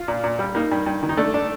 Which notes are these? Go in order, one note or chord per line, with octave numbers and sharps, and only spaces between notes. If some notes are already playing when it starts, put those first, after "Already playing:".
Already playing: F4
A#2
A#2
G3
A#3 D#4
G2
G2
D#3
D#4
A3 D4
D4